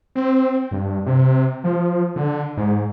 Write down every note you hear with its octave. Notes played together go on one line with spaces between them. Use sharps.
C4
G2
C3
F3
D3
G#2